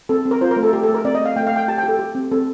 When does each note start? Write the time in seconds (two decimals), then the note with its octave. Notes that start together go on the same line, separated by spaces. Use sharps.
0.09 C4 A4
0.25 C4
0.31 A#4
0.41 F4 C5
0.51 A#4
0.56 A3
0.63 A4
0.73 A3 G4
0.83 A4
0.89 A3
0.94 A#4
1.05 C4 D5
1.15 D#5
1.20 A3
1.25 F5
1.36 A3 G5
1.47 F5
1.52 A3 G5
1.68 G4 A5
1.78 G5
1.83 G4
1.88 A4
1.99 G4
2.15 C4
2.32 C4 A4